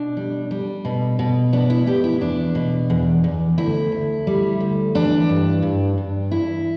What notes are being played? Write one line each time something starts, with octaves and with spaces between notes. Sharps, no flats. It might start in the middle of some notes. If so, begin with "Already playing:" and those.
Already playing: B2 D4
G3
G3
B2
B2
B3 D4
E4
B3 G4
E4
E2 D4
B2
E2
E2
D2 E4
D2
G3
D2
E3 D4
G2
G2
G2
E2 E4